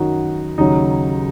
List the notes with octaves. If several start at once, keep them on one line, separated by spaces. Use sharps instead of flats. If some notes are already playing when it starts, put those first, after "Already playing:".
Already playing: F#2 D#3 F#3 D#4 F#4
D#2 C#3 F#3 D#4